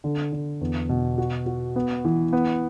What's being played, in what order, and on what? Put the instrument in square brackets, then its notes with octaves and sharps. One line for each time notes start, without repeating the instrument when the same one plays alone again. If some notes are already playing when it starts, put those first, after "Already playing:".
[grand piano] D3
D3
E2
B2
F#4
F#4
B3
E3
B3